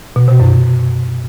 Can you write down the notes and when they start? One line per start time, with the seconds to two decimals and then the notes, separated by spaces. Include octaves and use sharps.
0.16 B2
0.28 C3
0.40 F#2